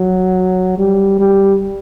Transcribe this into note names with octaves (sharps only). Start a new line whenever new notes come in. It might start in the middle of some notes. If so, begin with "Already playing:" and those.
Already playing: F#3
G3
G3